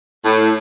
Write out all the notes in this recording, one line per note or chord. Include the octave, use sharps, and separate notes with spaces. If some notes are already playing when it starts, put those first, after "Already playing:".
A2